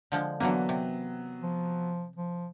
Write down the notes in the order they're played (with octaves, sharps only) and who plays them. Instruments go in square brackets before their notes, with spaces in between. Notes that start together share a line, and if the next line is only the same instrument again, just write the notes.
[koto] D3 F3 G#3
[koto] D3 E3 A#3 [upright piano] F#3 B3
[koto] C3
[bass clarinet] F3
F3